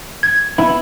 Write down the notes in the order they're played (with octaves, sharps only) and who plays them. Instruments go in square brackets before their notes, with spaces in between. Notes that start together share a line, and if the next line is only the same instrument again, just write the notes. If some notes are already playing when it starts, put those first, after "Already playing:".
[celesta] G#6
[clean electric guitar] B3 E4